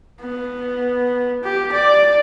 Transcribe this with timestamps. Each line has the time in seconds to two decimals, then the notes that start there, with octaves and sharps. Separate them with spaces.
0.21 B3
1.44 G4
1.73 D5